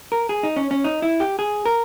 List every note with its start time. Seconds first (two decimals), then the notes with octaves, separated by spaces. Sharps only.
0.12 A#4
0.29 G#4
0.43 D#4
0.56 C#4
0.71 C#4
0.84 D#4
1.02 E4
1.20 G4
1.39 G#4
1.65 A#4